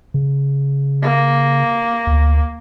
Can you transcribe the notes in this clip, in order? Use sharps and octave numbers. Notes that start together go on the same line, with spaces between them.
C#3
A#3
D2